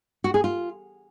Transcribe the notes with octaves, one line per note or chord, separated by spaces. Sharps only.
F#4
G#4
F4